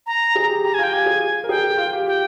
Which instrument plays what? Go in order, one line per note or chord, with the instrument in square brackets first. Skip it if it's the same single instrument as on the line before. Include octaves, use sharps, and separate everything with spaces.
[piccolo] A#5
[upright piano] G#4
G4
[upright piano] G4 [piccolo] A#5
[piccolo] G#5
[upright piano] F4 [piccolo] G5
[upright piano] G4 [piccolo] G#5
[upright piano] G#4
A#4
[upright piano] G#4 [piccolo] G5
[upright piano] G#4
F4
G4
[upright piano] G4 [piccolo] G5